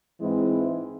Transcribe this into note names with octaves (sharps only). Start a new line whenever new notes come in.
G#2 E3 G#3 C4 E4